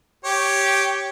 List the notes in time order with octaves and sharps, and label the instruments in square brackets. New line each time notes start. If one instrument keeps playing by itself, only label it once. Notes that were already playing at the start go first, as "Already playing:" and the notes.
[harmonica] G4 C#5